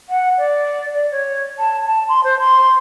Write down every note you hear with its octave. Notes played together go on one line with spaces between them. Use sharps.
F#5
D5
D5
C#5
A5
A5
C6
C5
C6